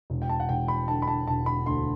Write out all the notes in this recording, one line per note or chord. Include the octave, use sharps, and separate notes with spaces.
E1
G5
A5
F#5
E1 G5
B5
D3 A5
B5
A5
E1 A5
B5
D2 C6